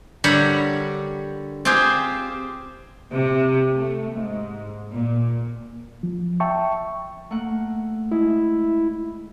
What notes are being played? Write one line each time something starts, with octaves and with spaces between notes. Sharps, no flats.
D3 G3 A#4 C#5 F#5 B5
C4 F4 G4 G#4 C5
C3
A3
G#2
A#2
F3
E5 G5 A5 C#6
A3 A#3 F#5
G#3 E4